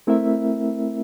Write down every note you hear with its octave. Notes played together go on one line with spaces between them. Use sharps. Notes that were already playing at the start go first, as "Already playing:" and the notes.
A3 C4 E4 A#4 E5